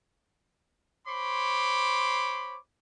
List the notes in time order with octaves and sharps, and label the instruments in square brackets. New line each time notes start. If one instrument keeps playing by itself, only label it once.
[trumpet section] C5 C#5 B5 C6 D6